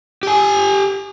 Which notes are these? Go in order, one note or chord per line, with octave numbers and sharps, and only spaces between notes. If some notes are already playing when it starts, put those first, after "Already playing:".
G4 G#5